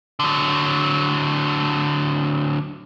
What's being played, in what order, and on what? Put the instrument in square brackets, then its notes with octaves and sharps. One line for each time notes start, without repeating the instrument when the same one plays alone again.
[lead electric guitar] D3 F#3